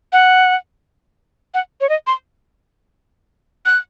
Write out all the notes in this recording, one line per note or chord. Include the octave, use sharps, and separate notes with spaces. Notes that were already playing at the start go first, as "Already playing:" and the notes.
F#5
F#5
C#5
D#5
C6
F#6